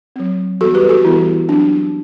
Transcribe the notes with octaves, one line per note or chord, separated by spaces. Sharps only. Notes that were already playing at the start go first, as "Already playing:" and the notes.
F#3 C4
E3 G3 B3 F#4 A4
G4 B4
F#4 A4
E3 G3 B3 E4
F#3 C4 D4